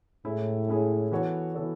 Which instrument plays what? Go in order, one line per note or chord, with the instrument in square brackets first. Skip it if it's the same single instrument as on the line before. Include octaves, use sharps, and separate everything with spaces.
[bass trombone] A2 [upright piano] G#3 C#4 E4 G#4
[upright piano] G#3 C#4 E4 G#4
E3 B3 F#4 A4 C#5
E3 B3 F#4 A4 C#5